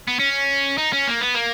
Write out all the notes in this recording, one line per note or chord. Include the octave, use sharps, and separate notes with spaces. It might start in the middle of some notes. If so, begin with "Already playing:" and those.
B3
C#4
D#4
C#4
A#3
B3
A#3